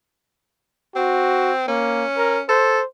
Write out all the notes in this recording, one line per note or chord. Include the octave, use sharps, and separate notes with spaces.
C4 F#4
A#3 C#4
A#4
A4 C5